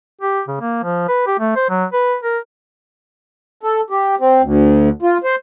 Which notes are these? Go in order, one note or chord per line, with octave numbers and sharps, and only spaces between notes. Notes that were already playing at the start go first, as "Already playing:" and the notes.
G4
C#3
A#3
F3
B4
G4
A3
C5
F#3
B4
A#4
A4
G4
C4
D2
F4
C5